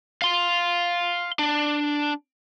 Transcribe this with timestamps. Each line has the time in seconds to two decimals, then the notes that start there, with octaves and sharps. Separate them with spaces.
0.22 F5 C6
1.39 D4